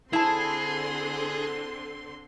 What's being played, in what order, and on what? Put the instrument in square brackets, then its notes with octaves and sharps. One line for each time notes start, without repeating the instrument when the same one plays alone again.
[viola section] D3 C4 C6 [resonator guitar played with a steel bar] E4 A5 [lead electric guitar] G#4